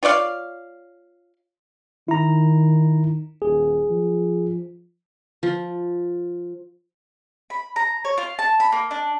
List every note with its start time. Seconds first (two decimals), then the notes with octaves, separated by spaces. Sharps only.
0.03 F4 C#5 D5 F5
2.08 D#3 E4 A#5
3.42 D#1 G#4
3.90 F3
5.43 F3
7.50 B5
7.76 A#5
8.05 C#5
8.18 F4
8.39 A5
8.60 B5
8.72 A#3
8.91 D4